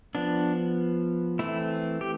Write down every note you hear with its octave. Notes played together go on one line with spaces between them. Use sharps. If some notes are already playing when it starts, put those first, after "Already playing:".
F3 B3 D4
E3 A3 C4 E4
G4